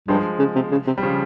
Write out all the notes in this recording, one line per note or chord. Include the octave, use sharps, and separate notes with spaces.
G2 F3 G#3
C#3
C3
C#3
C3
G3
C#3 F3